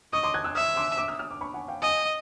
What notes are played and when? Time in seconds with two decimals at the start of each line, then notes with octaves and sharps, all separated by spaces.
0.13 D#5 C#6 D#6
0.23 C6 D6
0.34 F#6 G#6
0.44 E6 F#6
0.55 E5 D#6 F6
0.76 C6 D6
0.97 D6 E6
1.08 D#6 F6
1.19 D#6 F6
1.31 D6
1.41 B5 C#6
1.54 F#5 G#5
1.68 F5 G5
1.82 D#5 F#5 G#5